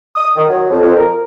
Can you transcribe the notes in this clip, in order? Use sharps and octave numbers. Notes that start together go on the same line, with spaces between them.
D#6
D#3
F#3
F2
F2
A#4